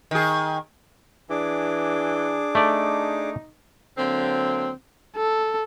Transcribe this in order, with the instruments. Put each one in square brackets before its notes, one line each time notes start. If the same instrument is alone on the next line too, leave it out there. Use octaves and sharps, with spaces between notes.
[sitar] D#3 G#4
[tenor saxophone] E3 [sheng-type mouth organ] D4 G#4 D6
[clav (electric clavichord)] A3 D5 [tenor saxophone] D#4
[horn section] D3 F#3 A#3 C4
[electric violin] A4